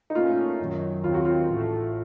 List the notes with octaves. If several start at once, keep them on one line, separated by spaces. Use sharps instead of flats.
D#4
A#2 A3 C#4 F4
F#2 D#3 F#3
D#2 D#3 F#3 C4 F4
F#4
F4
A1 A2 A3